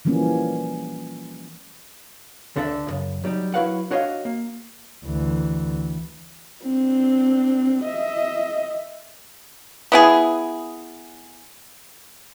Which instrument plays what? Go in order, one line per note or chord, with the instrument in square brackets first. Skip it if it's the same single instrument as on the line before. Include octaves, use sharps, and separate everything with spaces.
[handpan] E3 F3 G3 A#3 C#4
[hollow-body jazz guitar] C#2 D3 D4 A4 D5 E5
B1 F#2 C#3
F#3 G3 D#4
F#3 E4 F#4 B4 F5 F#5
D4 F#4 C#5 D#5 F5
A#3
[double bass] D2 E3
[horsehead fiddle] C4 D4
D#5 E5
[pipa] B3 E4 G#4